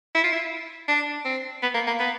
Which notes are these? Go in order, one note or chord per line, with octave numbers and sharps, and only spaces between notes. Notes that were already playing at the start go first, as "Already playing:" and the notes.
E4
F4
E4
D4
C4
B3
A#3
A#3
B3